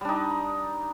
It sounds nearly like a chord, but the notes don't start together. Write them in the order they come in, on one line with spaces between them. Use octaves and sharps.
G3 D4 D#4